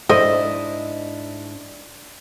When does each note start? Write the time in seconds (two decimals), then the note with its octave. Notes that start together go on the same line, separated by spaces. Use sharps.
0.09 G#2 D4 E4 A4 C5 D#5 E5